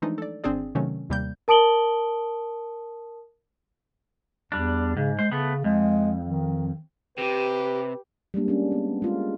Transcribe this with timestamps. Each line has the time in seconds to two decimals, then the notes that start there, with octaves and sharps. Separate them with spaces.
0.02 E3 F3 G#3 A3 D4 D#4
0.18 A4 D5
0.44 G#1 C4 D4 G#4 D5
0.75 C3 D#3 F#3 A3 C#4
1.10 D#2 C3 G3 A#3 G6
1.48 A#4 A5 D#6 D7 F#7 G7
4.52 E2 G3 D4
4.97 G#2 C#3
5.19 G#3 C5
5.32 C#3 A3 B3
5.64 F2 G#3
6.26 D#3
7.18 C3 G4 B4
8.34 G3 G#3 A#3 D4
8.48 C#4 D4
8.72 B3
9.02 G#3 F4